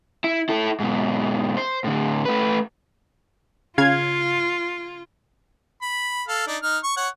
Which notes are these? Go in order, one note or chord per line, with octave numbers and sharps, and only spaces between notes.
E4
E4 A4
G#2 B2
C5
A2 D3
A3 B4
C#3 F4 F5 G#6
B5
A4 F5
D4 D#4
D#4 F6
C#6
C#5 F#5